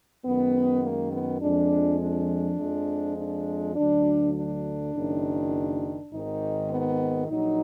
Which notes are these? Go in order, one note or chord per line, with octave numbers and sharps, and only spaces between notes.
F#2 D#3 G#3 B3
A#3
B3
F2 F3 G#3 D4
D4
F2 F3 G#3
D4
D2 D3 F#3 D4
D4
F#1 F#2 D#3
G#1 G#2 D#3 D#4
B3
A#1 A#2 F#3 D#4